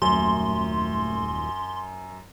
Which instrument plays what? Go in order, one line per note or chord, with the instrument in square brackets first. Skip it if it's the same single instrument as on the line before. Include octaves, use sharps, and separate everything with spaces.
[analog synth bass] D#1 [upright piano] F#2 [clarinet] A3 [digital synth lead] C6